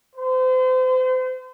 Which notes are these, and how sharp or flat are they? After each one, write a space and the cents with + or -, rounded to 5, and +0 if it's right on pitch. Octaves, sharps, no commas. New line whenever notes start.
C5 -35